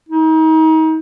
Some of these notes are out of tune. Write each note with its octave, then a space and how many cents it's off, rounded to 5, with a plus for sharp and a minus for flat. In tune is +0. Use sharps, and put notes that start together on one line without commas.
D#4 +35